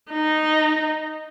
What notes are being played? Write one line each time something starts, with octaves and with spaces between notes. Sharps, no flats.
D#4